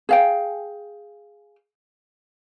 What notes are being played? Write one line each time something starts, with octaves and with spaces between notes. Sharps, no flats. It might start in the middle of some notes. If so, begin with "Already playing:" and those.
G#4 F5 G5